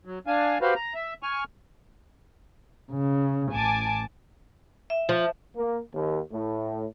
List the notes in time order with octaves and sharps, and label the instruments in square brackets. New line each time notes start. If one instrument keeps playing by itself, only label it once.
[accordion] F#3
D4 F5 G#5
F#4 G4 B4 C5 F5
A#5
E5
G#5 C#6 F6
[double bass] C#3
[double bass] A1 [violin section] G#5 A5 D6
[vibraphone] E5
[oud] F3
[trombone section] A#3
D#2
A2